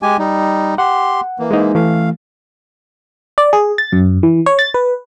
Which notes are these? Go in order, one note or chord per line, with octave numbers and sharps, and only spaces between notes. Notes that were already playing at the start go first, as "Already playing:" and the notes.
G#3 G4 G#5
G3 D#4
G4 F#5 C6
E3 A#3
G#3 D#4
E3 A3 F5
D5
G#4
A6
F#2
E3
C#5
A6
B4